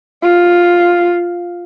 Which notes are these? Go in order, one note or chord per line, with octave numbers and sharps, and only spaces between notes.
F4